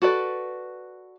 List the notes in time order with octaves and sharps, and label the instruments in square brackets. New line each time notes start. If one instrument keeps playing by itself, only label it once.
[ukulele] F#4 A4 B4 D5